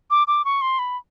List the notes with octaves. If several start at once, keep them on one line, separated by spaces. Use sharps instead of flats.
D6
D6
C#6
C6
B5